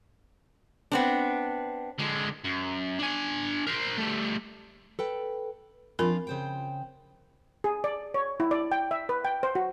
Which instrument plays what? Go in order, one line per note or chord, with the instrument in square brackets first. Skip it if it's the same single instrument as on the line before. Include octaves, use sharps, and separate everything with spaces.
[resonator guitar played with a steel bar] B3 C4 D4
[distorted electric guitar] D3 G#3
F#2
D4 G#5
A#4 C5
G3 A3
[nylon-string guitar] A4 B4 G5
[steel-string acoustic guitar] F3 D4 F4 [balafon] C4 A#4 B5
[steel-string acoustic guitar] C#3 C5 G5
[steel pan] G#4
D5
C#5
E4
D5
G5
E5
B4
G5
C5
F#4